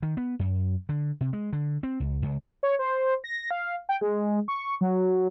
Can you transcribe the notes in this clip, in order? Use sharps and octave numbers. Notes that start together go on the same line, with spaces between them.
D#3
B3
F#2
D3
C3
G#3
D3
C4
C#2
C#2
C#5
C5
A#6
F5
G5
G#3
C#6
F#3